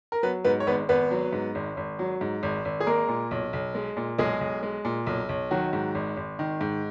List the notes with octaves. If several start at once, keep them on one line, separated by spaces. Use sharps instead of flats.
A#4
F#3 B3 B4
G#2 B3 B4
C#5
G#1 B3 B4
G#1 B3 B4
F#3
G#2
G#1
G#1
F#3
G#2
G#1
G#1
G#4
G#3 A#3 A#4
A#2
B1
B1
G#3
A#2
B1 G#3 G#4
B1
G#3
A#2
B1
B1
D#3 F#3 F#4
G#2
G#1
G#1
D#3
G#2